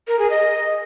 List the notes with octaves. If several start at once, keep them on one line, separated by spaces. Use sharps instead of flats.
A#4
G#4
D#5